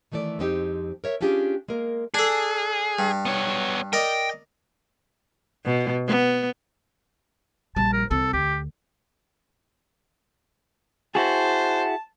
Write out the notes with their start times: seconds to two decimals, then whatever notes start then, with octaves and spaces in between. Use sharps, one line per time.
0.12 D#3 E3 A3 A4 D5
0.39 F2 G#3 C4 D#4 G4
1.04 A#4 C#5 E5
1.21 C#4 D4 F4 G4 G#4
1.68 G#3 A#3 A#4
2.14 D4 G#4 A4
2.99 G2
3.25 B3 C#5
3.93 A#4 D5 D#5 G5
5.65 B2
6.07 B3
7.76 A#1 G3 A5
7.93 A#4
8.11 C2 C4 A4
8.33 D2 G4
11.15 E4 F#4 G#4 C5 A5